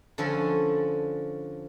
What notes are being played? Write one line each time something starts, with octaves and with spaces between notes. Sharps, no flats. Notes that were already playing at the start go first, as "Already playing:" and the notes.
D3 F3 C#4 A4 G#5 B5